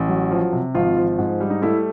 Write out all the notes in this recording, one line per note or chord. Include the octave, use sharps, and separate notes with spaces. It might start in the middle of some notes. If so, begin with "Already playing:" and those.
Already playing: A1
F#3
F3
C3
G#1 F3 F4
F3
G#2
G3
D#4
A3 E4